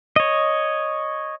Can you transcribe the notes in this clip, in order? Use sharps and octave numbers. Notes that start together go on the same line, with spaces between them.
C#5 D#5